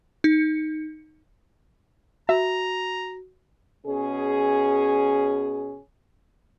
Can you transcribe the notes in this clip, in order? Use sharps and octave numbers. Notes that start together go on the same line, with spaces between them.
D#4
F#4 E5 A#5
B2 C#4 G#4